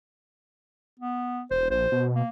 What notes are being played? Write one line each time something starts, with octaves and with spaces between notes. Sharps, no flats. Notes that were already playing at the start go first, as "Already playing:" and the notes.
B3
E1 C5
A#1 C5
B2
A#3